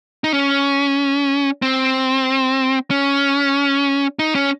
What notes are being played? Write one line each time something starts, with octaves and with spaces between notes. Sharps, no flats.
D#4
C#4
C4
C#4
D#4
C#4